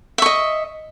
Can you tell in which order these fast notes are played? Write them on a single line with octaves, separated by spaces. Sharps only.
E5 C#6 D#5